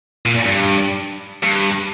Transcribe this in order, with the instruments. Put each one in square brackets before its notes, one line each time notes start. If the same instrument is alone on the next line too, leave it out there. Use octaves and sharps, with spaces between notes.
[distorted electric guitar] A#2
G2
G2